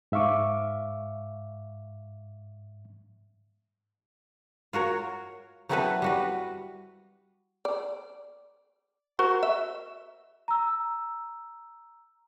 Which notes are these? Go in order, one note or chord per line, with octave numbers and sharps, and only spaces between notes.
G#2 E5 F5 C#6 D6
F4 F#4 A#4 C#5
F#3 B3 C4 E4 A4 B4
G3 F#4 B4
D5
F#4 A#4 C5
E5
A#5 E6